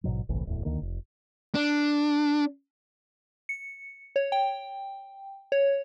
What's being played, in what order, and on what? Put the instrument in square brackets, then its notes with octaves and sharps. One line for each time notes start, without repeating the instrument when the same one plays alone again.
[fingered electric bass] A1 G#2 B2 F#3
G1 C2 A2 E3
D1 E2 A2
D2 D3 D#3 A#3
F1
[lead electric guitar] D4
[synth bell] C#7
C#5
G5
C#5